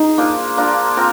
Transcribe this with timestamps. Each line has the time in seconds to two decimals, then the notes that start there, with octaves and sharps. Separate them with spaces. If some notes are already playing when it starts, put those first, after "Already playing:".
Already playing: D#4 G#4
0.17 A#3 D4 F4 C5
0.57 A#3 D4 F4 C5
0.97 C4 F4 A#4